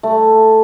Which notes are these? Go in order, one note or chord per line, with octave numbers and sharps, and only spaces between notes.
A3